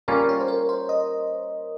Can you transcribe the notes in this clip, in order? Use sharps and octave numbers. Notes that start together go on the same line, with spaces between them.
G3 A#3 C#4 F4 A#4
C#5
C5
A#4
C5
D#5